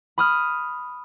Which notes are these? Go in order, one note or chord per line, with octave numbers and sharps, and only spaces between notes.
B5 D#6 F6